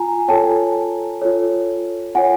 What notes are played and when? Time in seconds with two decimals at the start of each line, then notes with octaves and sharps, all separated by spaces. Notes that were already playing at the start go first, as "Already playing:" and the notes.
Already playing: F4 G#5 A#5
0.28 F4 A4 C#5 G5 A5
1.21 F4 A4 C#5
2.15 F4 A4 C#5 F#5 G#5